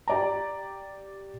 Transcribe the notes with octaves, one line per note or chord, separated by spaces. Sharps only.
G4 D5 A#5